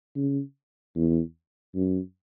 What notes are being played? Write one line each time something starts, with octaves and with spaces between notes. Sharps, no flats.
C#3
E2
F#2